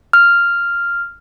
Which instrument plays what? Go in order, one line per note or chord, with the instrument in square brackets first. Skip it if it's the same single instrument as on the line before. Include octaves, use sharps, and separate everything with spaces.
[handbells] F6